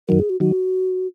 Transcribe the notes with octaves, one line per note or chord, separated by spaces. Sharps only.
F#2 D#3 F#3 A#4
G#4
F#4
D#3 F#3 F#4